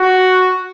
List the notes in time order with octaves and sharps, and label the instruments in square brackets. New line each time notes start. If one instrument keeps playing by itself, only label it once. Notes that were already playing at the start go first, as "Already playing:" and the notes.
Already playing: [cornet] F#4